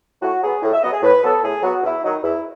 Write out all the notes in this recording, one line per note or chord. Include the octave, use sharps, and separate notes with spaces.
A2 F#4
F#3 B3 G#4
A2
E5
F#3 B3 D#5
G#4
A2 B4
F#3 B3 A4
A2 G#4
F#3 B3 F#4
E2 E4
D#3 F#3 D#4
E2 E4